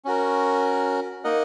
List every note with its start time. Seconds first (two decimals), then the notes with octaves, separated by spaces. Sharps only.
0.05 C#4 F#4 A#4
1.24 A#3 D#4 A#4 D#5 F#5